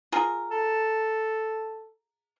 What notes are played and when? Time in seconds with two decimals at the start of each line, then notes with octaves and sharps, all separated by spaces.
0.12 F4 G#4 A#4
0.51 A4